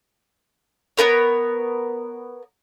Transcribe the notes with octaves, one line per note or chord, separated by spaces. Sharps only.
B3 D4 A#4 C#5